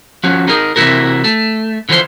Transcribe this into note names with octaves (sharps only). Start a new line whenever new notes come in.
F3 C#4 F#4
D#4 G#4 A#4
C3 E3 F#3 E4 F#4 A#4
A3
D3 E3 F3 B4 C5